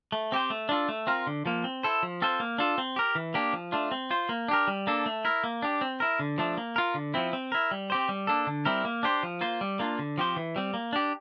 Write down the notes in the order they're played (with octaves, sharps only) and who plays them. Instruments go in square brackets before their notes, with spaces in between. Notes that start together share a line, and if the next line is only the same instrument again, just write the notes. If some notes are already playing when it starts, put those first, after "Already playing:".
[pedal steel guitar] A3
C4 G4 C5
A3
D4 F4 A4
A3
C4 F4 A#4
D3
F3 A#3
C4
E4 A4 C5
F3
C4 F4 A4 C5
A#3
D4 F4 A4
C4
G4 A#4
E3
A#3 D4 G4
F3
A3 D4 F4
C4
F4 C5
A#3
D4 G4 A#4
G3
A#3 D4 A4
A3
E4 A#4
A#3
D4 G4
C4
E4 A#4
D3
F3 A3 D4
A#3
F4 A#4
D3
F3 C4 E4
C4
E4 A#4
G3
C4 G4 C5
G3
A#3 D4 A4
D3
G3 C4 E4 A#4
A#3
D4 G4 C5
F3
A#3 F4 C5
G3
A#3 D4 F4
D3
F3 C4 G4 C5
E3
G3 C4
A#3
D4 G4